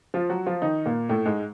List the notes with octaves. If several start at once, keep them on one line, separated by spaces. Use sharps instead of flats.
F3 F4
F#3 F#4
F3 F4
D#3 D#4
A#2 A#3
A2 A3
G#2 G#3